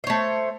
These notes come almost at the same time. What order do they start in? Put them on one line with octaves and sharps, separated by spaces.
C5 C#5 A3